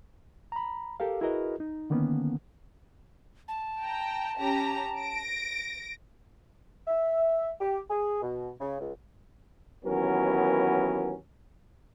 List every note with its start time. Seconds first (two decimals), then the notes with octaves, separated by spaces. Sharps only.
0.52 A#5 B5
1.00 G4 A4 A#4 F5
1.21 E4 F#4 G#4 A#4 B4 D#5
1.60 D#4
1.90 D3 D#3 A#3 B3 C#4
3.48 A5
3.82 G5 A#5
4.39 C#4 G4 A#5
5.00 A#6 D7
6.87 E5
7.60 G4
7.89 G#4
8.22 B2
8.61 C#3
8.79 C#2
9.84 D#2 E3 F#3 B3 C#4 A#4